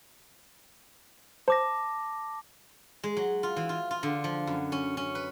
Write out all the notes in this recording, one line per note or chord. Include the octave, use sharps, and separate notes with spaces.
C5 A5 D6 A#6
G#3
F#3
F4
E3
F4
F4
D3
F3
F#2
C#4
C#4
B4